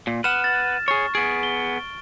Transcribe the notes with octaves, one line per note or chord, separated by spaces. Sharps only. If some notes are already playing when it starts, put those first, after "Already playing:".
A#2
B4 F#5 F6 E7
A6
G#4 C#5 C#6
B3 G#4 D7
G7